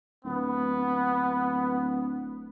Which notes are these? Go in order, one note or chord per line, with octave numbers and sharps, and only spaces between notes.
D1 B3